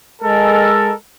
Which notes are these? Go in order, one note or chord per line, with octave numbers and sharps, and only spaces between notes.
G#3 A4 A#4